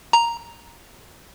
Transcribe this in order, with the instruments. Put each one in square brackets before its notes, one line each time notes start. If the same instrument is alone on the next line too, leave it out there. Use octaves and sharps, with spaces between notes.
[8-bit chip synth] A#5